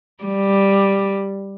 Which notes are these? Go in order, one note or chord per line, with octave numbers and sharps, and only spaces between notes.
G3